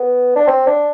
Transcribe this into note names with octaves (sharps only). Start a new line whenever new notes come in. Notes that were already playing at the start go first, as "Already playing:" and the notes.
Already playing: B3
D4
C4
D4